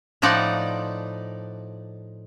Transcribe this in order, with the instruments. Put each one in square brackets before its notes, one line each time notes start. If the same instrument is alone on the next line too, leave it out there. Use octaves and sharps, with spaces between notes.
[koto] A2 F3 D#4 D5 F#5